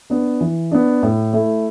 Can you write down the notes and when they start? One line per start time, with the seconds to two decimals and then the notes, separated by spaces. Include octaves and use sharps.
0.10 B3 D4
0.41 E3
0.71 B3 D4
1.03 A2
1.33 A3 E4